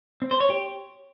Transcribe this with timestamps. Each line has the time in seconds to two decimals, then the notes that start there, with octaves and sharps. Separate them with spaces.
0.22 C4
0.31 C5
0.40 C#5
0.50 G4